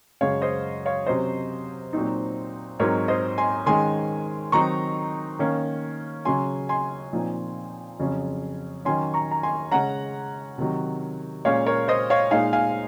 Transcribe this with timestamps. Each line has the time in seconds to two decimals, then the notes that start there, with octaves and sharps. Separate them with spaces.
0.21 F#2 C#3 G#3 C#5 F5
0.42 C5 D#5
0.86 C#5 F5
1.06 C3 F#3 C#4 C5 D#5
1.93 A#2 F#3 C4 D#4
2.79 G#2 F#3 C4 D#4 A#4 C#5
3.08 C5 D#5
3.38 G#5 C6
3.66 D#3 G#3 C#4 G#5 C6
4.52 D#3 F#3 C4 D#4 A#5 C#6
5.39 D#3 A#3 C#4
6.25 C#3 F#3 C#4 G#5 C6
6.69 G#5 C6
7.13 A#2 F3 C4 D#4
8.00 F2 C#3 F#3 C#4
8.85 D#3 F#3 C#4 G#5 C6
9.14 A#5 C#6
9.31 A#5
9.43 G#5 C6
9.71 C#3 G#3 C#4 F#5 A#5
10.58 C3 D#3 F#3
11.45 A#2 G#3 C#4 C#5 F5
11.66 A#4 C#5
11.88 C5 D#5
12.10 C#5 F5
12.31 A#2 G#3 D#4 F5 G#5
12.53 F5 G#5